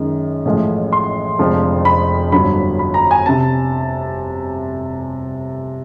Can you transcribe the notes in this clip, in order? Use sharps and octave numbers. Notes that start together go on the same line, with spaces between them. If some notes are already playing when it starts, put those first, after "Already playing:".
Already playing: F#2 D#3 G#3
A1 A2 F3 G#3
C6
F1 F2 D3 F3 G#3
B5
G1 G2 D3 F#3 B5
B5
A#5
G#5
C3 A5